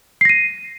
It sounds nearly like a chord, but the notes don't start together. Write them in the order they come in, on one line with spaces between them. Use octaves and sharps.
C7 A#6 D#7